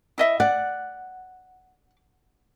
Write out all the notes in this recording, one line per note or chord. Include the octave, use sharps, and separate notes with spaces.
E4 D#5 E5
D5 F#5